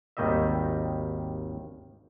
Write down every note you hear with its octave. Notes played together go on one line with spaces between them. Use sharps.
G#1 D#2 D#3 G3 D#5 E5